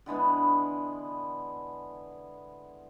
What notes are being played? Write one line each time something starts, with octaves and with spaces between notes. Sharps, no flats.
D3 E3 G#3 B3